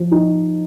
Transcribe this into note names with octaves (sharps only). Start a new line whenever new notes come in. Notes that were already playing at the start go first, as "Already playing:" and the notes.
Already playing: F3
D#4